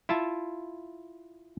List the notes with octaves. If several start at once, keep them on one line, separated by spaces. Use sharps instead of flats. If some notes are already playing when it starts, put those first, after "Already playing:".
E4 F4 E5 A5